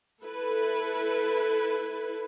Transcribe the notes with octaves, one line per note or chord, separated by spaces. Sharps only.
E4 A4 B4